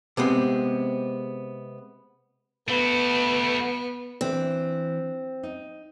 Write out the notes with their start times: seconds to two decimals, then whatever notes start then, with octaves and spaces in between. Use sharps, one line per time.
0.17 C3 G#3 B3 C4
2.68 A3 B3 F#4
4.21 E3 C4 D4
5.43 D#4